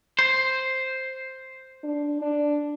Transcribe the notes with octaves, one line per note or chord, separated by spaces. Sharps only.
C5
D4
D4